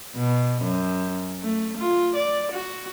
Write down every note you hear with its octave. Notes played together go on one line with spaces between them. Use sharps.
B2
F#2
A3
F4
D5
F#4